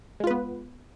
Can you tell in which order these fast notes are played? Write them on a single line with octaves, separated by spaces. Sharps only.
G#3 F4 B4 B3